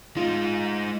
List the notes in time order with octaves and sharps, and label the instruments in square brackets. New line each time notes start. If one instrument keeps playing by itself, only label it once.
[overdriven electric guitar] G#3 D#4 [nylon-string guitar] F4